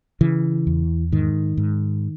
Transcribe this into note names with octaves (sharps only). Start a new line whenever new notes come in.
C#3 E3
E2
G#2 D#3
G#2